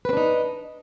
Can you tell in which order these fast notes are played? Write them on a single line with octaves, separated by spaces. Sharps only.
B4 C4 D4 D#4